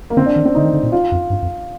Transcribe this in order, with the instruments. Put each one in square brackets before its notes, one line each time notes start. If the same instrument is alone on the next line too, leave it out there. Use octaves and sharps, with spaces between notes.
[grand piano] A#3
[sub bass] D3 [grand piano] C4
[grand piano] D4
[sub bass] D#3
[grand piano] C4
[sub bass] D3 [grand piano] D#4
[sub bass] D#3
D3
A#2
[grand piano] F4
[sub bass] F2
G2
F2